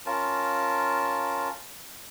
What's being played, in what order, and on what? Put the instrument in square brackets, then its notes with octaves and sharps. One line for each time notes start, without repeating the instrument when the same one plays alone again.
[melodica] C#4 F4 A#4 A5